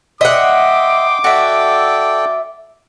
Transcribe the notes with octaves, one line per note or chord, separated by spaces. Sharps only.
D#5 E5 F#5 G5 C6 D6 D#6
F#4 A4 D5 E5 G5